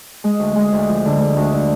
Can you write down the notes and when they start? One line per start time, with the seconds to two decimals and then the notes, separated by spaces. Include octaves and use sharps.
0.24 G#3
0.40 D2
0.56 G#3
0.73 D2
0.89 F3
1.05 D3
1.21 G#3
1.37 D2
1.53 D3